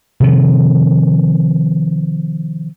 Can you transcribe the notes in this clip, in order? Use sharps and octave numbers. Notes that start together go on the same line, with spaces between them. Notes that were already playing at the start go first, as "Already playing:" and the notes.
C3 D#3 F3